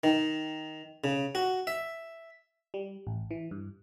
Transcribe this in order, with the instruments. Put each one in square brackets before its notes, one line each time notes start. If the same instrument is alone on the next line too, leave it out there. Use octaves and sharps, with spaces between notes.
[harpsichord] D#3
C#3
F#4
E5
[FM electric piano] G3
A1
E3
G2